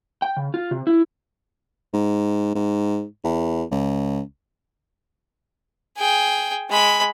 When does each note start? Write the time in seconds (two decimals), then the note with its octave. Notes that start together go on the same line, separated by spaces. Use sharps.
0.22 G5
0.37 C#3
0.54 F4
0.71 C3
0.87 E4
1.93 G#2
2.55 G#2
3.25 E2
3.71 C#2
5.98 G#4 G5
6.70 G#3 B5